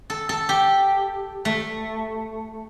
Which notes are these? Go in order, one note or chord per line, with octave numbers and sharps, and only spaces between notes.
A4
A4
G4
A3